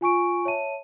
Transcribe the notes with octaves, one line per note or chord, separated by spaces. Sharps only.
F4 G#5 C#6 D7
C#5 E5 A5 D#7